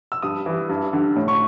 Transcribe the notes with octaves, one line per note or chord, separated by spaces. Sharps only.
E6
G2 D#6
E3
G2
D3
A2
C#6